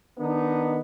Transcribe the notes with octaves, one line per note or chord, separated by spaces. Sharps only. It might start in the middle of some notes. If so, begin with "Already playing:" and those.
D#3 B3 D4 D#4